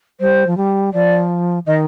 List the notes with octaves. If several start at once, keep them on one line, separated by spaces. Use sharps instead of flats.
G3 C5
F3
G3
F3 D5
D#3 D#5